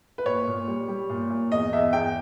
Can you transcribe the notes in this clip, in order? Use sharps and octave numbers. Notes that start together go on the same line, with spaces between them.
B4
A#2 C#5
A#2
G3
G3
A#2
A#2
E2 D#5
E2 E5
E2 G5